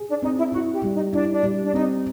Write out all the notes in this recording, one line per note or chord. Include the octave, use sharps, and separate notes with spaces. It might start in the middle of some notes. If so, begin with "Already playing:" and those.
Already playing: G#4
D4
C4 D#4
E4
E4 F#4
G4
G3
D#4
D4 E4
D4
G3
D4
C4 D#4